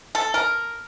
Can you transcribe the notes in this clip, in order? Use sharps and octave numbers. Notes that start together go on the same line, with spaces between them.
A4
A#4